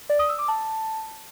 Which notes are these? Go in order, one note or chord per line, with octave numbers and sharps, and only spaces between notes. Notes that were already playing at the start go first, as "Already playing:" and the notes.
D5
D#6
E6
D6
A5